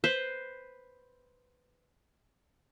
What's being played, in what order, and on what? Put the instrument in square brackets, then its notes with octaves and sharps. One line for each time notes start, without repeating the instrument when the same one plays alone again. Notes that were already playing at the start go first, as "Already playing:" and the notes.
[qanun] B4 C5